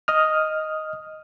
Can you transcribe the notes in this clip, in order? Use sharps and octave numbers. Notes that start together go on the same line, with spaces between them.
D#5 D#6 F6